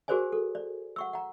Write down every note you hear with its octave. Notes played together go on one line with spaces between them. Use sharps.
F#4 G#4 A#4 C5 D5 G#5
A4
D5
F#5 C#6 E6
F#5 A#5